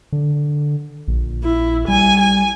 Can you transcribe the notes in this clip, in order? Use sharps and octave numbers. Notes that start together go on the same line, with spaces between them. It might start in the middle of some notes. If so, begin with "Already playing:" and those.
D3
A#1
E4
G3 G#5
G#5